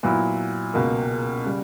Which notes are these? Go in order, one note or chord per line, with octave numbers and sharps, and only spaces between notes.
A#2 F#3 B3 E4
C#2 B2 A#3
C#3 G3